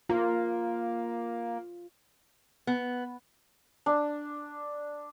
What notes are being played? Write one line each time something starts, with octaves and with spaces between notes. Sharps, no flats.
A#3 F4
B3
D4